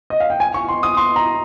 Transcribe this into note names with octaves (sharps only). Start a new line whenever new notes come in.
D#5
F5
G5
G#5
C#6
C6
D#6
C6
A#5